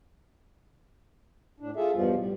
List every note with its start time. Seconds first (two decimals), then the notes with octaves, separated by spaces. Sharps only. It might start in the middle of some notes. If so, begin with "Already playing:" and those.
1.60 A2 D4
1.76 F4 G#4 A4 E5
1.94 E2 G2 B2 F3 G3 F4
2.16 A2 G3